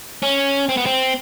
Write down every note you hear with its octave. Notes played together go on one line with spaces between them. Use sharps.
C#4
C4
B3
C4